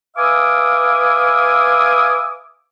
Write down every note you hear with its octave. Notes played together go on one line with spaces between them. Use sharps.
B4 E5 F5 G#5 D6 D#6